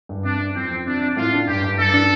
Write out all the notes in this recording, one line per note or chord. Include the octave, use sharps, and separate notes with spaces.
G2
C3 D4
C3
F2 C4
F2
C3 D4
C3
A2 F4
D4
G2 G4
G2
G2 A4
D4